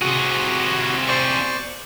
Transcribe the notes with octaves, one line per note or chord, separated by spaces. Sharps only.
C3 F#4 G#4
C5 D5 C#6